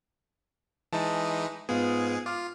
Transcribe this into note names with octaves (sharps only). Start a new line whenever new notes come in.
E3 G#3 D#4 A5
G#2 B3 F4 G#4
F4 D6 F6